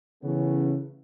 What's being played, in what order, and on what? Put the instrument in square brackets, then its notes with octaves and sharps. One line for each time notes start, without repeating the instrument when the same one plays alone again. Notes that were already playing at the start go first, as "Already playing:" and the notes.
[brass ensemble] C#3 E3 A3 B3 C#4